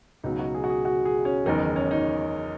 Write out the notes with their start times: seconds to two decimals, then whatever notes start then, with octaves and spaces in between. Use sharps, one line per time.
0.24 C#2 B2 F#3 D#4
0.39 F#4
0.54 G#4
0.64 F#4
0.70 G#4
0.85 F#4
1.05 G#4
1.25 C#4
1.46 F#1 E2 D#3 D#4
1.76 C#4
1.91 D#4